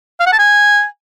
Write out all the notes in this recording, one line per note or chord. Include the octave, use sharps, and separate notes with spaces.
F5
F#5
A5
G#5